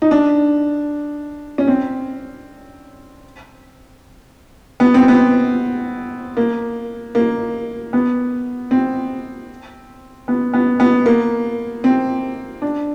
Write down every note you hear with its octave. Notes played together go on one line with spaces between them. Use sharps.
D#4
D4
C#4
C4
B3
C4
B3
A#3
A#3
B3
C4
B3
B3
B3
A#3
C4
D4